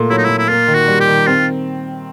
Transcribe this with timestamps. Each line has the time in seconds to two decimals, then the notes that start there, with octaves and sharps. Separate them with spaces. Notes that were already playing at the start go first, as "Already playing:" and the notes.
Already playing: A#2 A3
0.10 F#3 E4
0.18 D#4
0.24 A#2 E4
0.38 E4
0.49 A#3 F4
0.68 D#3
0.74 F#4
0.88 G3
1.00 G4
1.08 D#3
1.26 C4 F4